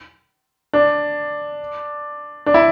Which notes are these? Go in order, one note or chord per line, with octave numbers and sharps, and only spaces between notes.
D4
D4
E4